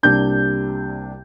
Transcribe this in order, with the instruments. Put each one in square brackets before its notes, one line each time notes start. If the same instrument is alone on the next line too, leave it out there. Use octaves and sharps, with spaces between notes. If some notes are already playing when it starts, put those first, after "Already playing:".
[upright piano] C2 C3 A#3 D4 G6